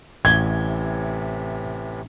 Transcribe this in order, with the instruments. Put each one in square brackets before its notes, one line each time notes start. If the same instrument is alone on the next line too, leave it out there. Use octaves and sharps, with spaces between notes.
[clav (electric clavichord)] A1 [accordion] A2 C3 E3 [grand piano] G#6 G7